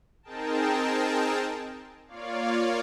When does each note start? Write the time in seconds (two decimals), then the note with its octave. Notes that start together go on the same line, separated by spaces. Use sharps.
0.23 C4 D#4 G#4 A#4 G5 A5
2.07 A#3 F4 C#5 D5 F5